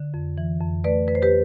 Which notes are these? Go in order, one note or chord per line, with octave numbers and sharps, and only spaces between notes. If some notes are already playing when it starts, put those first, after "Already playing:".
Already playing: D3
F2
E3
F2
A3 B4 D5
F2 B4
C5
G4 B4